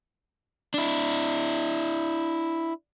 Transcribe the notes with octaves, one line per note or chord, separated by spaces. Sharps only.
D4 E4